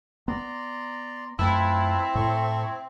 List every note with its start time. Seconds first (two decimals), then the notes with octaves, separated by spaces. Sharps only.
0.28 B3 D5 A#5 C6
1.39 F#2 A3 C4 E4 F4 B4 A5
2.15 A2 A4 C6 C#6